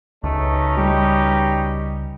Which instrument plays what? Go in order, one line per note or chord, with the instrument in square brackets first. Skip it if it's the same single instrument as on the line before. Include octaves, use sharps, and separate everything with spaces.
[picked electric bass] C#2 [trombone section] B2 C#4 D#4 [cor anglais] A3
[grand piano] G3 [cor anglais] G4